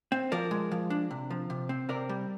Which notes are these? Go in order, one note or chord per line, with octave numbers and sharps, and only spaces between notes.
C4
F3 A#4 D5
G#3
F3
D4
C3
F3
C3
C4
C3 A#4 D5
G3